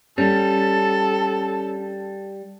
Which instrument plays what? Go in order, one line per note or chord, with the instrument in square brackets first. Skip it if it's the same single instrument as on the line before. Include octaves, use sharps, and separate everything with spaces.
[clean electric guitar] G3 [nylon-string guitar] C#4 [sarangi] A4